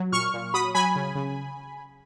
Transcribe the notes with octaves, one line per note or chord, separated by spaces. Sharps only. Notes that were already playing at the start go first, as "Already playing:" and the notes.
Already playing: F#3
A#2 C#6 F6
A#2
F#3 B5 D#6
F#3 G#5 B5
C#3
C#3